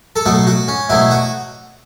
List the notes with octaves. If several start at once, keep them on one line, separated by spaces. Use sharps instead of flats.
A4
B2 F#3 A3 F#4
F#4
C#4
B2 F#3 A3 E4
F#4